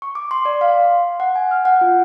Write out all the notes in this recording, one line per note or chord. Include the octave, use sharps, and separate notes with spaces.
C#6
D6
C6
D5
F5
C6
F#5
G#5
F6
F#5
F4